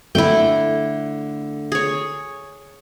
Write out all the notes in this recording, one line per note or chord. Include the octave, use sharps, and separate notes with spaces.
D3 A3 E4 G5
G#4 C#5